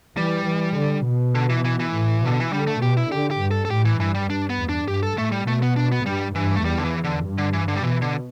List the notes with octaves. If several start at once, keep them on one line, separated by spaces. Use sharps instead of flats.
E3 G3
E3
D3
B2
D3
E3
E3
E3
A2
B2 D3
E3
D3 G3
A3
B2 G4
E4
D3 G4
G4
G2
A4
A4
A2 G4
E3
G2 E3
G3
D4
B3
E2
D4
G2 G4
A4
A2 A3
G3
B2 A3
B3
D4
B3
G2 G3
G2 E3
A3
E2 G3
D3
E3
D3
G2
D3
E3
D3
G3
B2 E3
D3